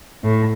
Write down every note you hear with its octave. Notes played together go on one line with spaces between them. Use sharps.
A2